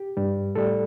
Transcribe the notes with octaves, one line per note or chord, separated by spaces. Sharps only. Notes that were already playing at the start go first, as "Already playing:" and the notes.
Already playing: G4
G2 G3
A2 G3 A4